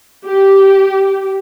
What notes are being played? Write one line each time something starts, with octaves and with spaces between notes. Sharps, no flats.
G4